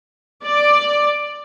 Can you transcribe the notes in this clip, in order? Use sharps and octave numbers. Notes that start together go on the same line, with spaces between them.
D5